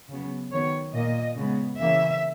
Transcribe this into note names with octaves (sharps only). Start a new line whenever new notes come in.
C#3 F#3 B3
D#3 F#3 B3 C#5
A#2 A#3 D#5
C#3 G#3 B3
C#3 E3 A#3 E5